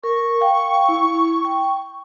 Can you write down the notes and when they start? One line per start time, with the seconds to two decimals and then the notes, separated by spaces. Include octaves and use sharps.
0.04 A#4 C#6
0.41 F5 G5
0.89 E4
1.45 G5